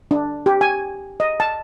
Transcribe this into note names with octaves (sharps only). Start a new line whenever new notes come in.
D4
G4
G#5
D#5
A5